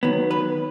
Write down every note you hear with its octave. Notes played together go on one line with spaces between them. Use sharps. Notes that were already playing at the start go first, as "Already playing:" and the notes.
D#3 F#3 B3
B4